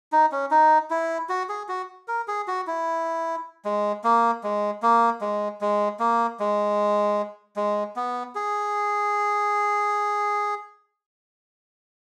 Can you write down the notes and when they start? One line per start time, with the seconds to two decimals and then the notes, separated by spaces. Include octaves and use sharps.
0.12 D#4
0.32 C#4
0.51 D#4
0.90 E4
1.29 F#4
1.49 G#4
1.68 F#4
2.08 A#4
2.28 G#4
2.48 F#4
2.67 E4
3.65 G#3
4.04 A#3
4.43 G#3
4.82 A#3
5.21 G#3
5.61 G#3
5.99 A#3
6.40 G#3
7.56 G#3
7.96 B3
8.35 G#4